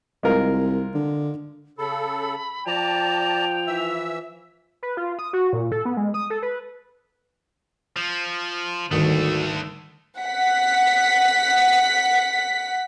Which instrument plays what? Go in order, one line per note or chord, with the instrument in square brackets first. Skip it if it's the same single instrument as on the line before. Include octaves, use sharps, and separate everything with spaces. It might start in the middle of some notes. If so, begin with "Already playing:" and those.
[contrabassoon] C2 [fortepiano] G#3 F4 A#4
[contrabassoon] D3
[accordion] C#3 A4 [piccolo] B5
[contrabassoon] F3 [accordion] D5 A5 A#5 [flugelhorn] G5 [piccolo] F7
[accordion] E3 E5 E6
[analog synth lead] B4
F4
D#6
F#4
A#2
A4
B3
G#3
D#6
A4
B4
[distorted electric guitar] F3
[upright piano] G#1 D#6 [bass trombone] D2 [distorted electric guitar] D3 A3 [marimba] D#3 G3
[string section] F#5 B6